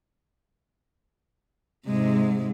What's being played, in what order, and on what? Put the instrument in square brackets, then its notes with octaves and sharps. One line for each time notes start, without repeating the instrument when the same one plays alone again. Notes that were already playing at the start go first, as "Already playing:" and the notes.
[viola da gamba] G#2 C3 [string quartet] G#3